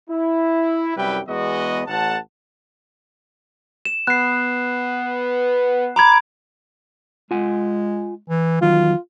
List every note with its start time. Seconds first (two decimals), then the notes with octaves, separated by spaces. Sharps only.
0.10 E4
0.96 C2 F#2 G3 E4 B4 G5
1.28 E2 G#3 B3 F#4 D#5
1.87 A1 F#5 A5
3.85 E7
4.07 B3 F#6 C7
5.96 A#5 B5 D6 G#6
7.31 G#3 F4 F#5 G#5
8.29 E3
8.62 E2 D#3 F#3 F4